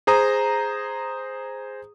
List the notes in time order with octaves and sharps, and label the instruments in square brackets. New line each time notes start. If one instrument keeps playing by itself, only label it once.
[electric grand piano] G#4 C5 A#5 D#6